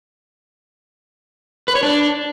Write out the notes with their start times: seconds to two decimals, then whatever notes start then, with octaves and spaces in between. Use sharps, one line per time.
1.68 B4
1.75 C#5
1.83 D4